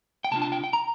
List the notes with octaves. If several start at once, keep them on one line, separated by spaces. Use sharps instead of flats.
G5
C3 G3 A#3 D4 F4 A5
A5
G5
G5
A#5